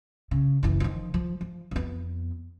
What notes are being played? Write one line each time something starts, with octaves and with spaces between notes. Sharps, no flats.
C#3
F#1 E3
D#3 F3
F3
F3
F2 B3